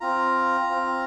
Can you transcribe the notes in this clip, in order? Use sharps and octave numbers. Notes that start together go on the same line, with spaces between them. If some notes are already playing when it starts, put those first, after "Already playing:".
C4 F4 A#5
C4 F4